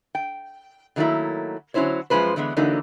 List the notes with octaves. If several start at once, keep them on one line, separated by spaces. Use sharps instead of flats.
G5
D3 D#3 F#3 A3 A#3 E4
D3 F#3 C#4 E4 C5 C#5
F#2 F3 G#3 B3 B4 C5
D3 E3 G#3 B3
D3 E3 F#3 A#3 D#4